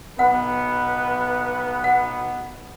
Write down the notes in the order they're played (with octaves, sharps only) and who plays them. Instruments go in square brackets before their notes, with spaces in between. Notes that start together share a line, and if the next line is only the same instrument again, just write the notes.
[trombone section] B1 B2 B3 [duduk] B4 [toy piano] F#5
[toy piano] F#5